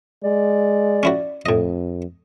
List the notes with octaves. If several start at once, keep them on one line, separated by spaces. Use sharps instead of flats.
G#3 D5
C#4 E4 F#4
F2 A2 D#5